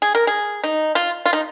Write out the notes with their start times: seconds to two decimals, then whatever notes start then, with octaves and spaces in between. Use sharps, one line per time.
0.02 G#4
0.15 A#4
0.27 G#4
0.64 D#4
0.95 F4
1.25 F4
1.33 D#4